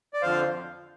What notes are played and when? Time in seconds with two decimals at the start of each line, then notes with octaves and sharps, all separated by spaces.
0.14 D5
0.22 F2 D3 F3 C5 F5